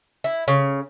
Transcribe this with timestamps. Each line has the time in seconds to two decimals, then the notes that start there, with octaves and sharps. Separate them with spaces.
0.24 E4
0.48 C#3